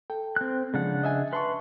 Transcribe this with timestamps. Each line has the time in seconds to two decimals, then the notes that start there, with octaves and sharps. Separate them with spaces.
0.10 A4 G5
0.36 C4 F#6
0.74 C#3 F3 G#3 D4 F#5
1.03 D#5 E5 G#5
1.33 B4 E5 A5 C6 C#6